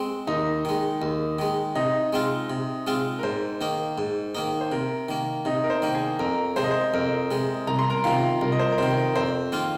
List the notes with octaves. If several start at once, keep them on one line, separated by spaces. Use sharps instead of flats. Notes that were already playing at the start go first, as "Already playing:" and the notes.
Already playing: G#3 C4
D#2 D#4 D#5
D#3 G#3
D#2
D#3 G#3
C3 D#4 D#5
G#3 C4 F4
C3
G#3 C4 F4
A#4
G#2 C5
D#3 A#3 D#4
G#2
D#3 A#3 D#4
C5
C3 A#4
D#3 A#3
C3 D#4 D#5
A#4
C5
D#3 A#3
G#4 G#5
F2 A#4 A#5
C3 G#3 C5
D#5
C5
F2 A#4
C3 G#3
C2 A#5
C6
A#4 A#5
C3 D#3 F4 F5
C2 A#4
D#5
C5
A#4
C3 D#3 C5
A#4
F2 C5
D#3 A#3 F4